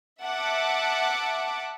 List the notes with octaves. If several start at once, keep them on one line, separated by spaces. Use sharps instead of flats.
E5 F#5 A5 D6